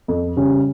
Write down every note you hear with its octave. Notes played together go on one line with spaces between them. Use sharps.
F2
C#3 G3 C#4